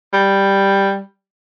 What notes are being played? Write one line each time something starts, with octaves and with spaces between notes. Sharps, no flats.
G3